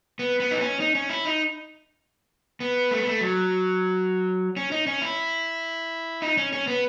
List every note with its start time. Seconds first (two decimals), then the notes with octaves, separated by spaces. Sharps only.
0.19 B3
0.40 B3
0.51 D#4
0.60 C#4
0.80 D#4
0.95 C#4
1.10 E4
1.25 D#4
2.60 B3
2.91 A3
2.99 B3
3.07 A3
3.21 F#3
4.57 C#4
4.71 D#4
4.87 C#4
5.02 E4
6.22 D#4
6.37 C#4
6.53 C#4
6.67 B3